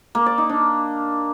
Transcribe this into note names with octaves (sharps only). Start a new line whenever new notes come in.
A#3
D5
D#4
D4